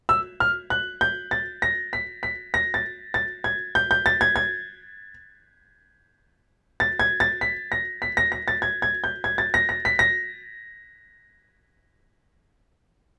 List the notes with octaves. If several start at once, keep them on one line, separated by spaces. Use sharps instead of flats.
E6
F6
F#6
G6
A6
A#6
B6
B6
A#6
A6
A6
G#6
G6
G6
A6
G#6
G#6
A6
G#6
A6
B6
A#6
B6
A#6
A#6
A6
G#6
G#6
G6
G#6
A6
A#6
A#6
B6
A#6